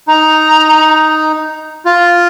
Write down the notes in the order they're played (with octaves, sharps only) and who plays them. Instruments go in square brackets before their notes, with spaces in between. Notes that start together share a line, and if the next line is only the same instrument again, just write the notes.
[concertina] D#4 [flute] A#5
[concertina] F4